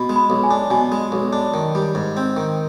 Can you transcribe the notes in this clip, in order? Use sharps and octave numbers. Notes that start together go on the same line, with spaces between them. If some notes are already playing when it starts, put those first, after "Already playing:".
Already playing: B2 B5
G#3
B5
B1
G#5
D4
B2 G#5
G#3
B1
D4
D#3
G3
G#2
C4
D#3